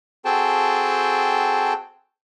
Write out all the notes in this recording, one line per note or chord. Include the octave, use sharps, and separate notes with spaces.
C4 F#4 G#4 A4 G5 A5